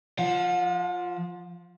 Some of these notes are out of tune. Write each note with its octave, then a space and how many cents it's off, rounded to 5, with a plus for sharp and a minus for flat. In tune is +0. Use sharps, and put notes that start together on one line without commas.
F3 +0 F#5 -45